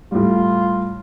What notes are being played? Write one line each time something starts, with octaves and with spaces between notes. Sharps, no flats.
A2 G3 F4